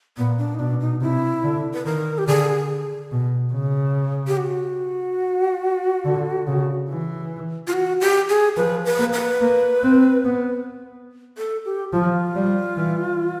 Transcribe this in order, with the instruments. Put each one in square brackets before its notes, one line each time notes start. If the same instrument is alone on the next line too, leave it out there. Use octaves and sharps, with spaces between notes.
[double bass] A#2 [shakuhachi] B3
[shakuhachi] D4
D#4
[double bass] B2 [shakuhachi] D4
[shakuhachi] D#4
[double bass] C3 [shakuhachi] E4
[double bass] D3
[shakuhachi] B4
[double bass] D#3 [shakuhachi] A#4
[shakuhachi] G4
[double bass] D3 [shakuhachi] G#4
[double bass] B2
C#3
[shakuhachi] G4
F#4
[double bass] D3
C#3
E3
[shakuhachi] F4
F#4
G4
G#4
[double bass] F3 [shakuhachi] B4
[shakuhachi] B4
[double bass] A#3
[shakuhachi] B4
[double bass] A#3
C4
B3
[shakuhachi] A4
G4
[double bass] F3 [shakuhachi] F4
[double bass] G3
E3